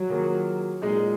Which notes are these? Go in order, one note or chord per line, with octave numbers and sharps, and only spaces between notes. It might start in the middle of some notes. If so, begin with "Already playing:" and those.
Already playing: F#3
D#3 A#3 F4 G#4
A#2 F#3 G#3 D#4 G#4